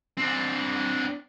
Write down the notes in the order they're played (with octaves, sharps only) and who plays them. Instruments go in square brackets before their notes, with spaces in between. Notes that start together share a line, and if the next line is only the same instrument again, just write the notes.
[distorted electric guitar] C4 D4